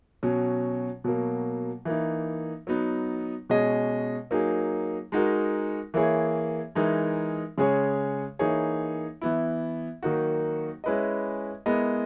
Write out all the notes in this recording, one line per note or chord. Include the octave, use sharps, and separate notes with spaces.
B2 F#3 C#4
B2 F#3 A#3
E3 A#3 D#4
F#3 B3 D#4
B2 G#3 C#4 G#4 D#5
F#3 A#3 D#4 G#4
G#3 D#4 F#4 A#4
E3 A#3 E4 G#4 C#5
E3 G#3 D#4 A#4
C#3 G#3 C#4 G#4 C#5
E3 A#3 D#4 G#4 C#5
E3 B3 E4
D#3 F#3 A#3 D#4 F#4
G#3 C#4 E4 B4 D#5
G#3 B3 E4 A#4 D#5